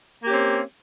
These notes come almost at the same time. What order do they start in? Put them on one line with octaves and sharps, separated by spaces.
A#3 G4 C#4 C4